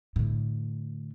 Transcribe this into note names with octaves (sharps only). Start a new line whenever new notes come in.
A2 D3